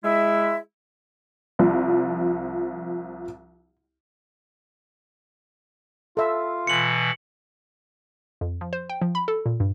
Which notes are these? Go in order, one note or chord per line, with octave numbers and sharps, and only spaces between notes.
G#3 E4 E5
C2 F3
F4 A4 E5
B2 E3 C#7 F#7
F2
F3
C5
G5
F3
B5
A4
A#2
G2